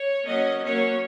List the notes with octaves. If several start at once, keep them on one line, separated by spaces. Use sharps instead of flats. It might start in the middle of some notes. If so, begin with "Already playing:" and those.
Already playing: C#5
F#3 A#3 C#4 D#5
F#3 A#3 C#4 C#5